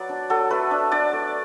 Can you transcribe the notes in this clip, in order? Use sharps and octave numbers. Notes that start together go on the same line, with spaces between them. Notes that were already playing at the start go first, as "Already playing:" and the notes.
Already playing: F#3 B4 D5 F#5
D4
F#3 A4
A3 B4
D4
D4 D5
A3